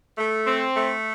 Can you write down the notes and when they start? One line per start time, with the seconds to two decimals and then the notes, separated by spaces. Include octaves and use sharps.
0.18 A3
0.46 C4
0.75 A3